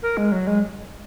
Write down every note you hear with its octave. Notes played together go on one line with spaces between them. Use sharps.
A#4
G#3
F#3
G#3